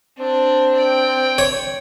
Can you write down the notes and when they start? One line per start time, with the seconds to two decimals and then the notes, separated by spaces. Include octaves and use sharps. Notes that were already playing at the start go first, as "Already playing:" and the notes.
0.19 C4 D4
0.77 D5 G5
1.38 C#5